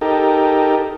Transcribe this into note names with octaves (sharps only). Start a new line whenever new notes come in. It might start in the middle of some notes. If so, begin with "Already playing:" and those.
D#4 G4 A4 A#4